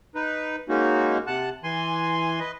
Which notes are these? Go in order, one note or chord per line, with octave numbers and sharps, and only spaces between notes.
D#4 B4
G#3 A#3 C#4 D#4 F#4
C3 F#5 A5 F#6
E3 G#5 C6
B4 D#5